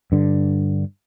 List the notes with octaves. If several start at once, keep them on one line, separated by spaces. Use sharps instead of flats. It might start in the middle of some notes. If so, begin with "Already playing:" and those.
G2 D3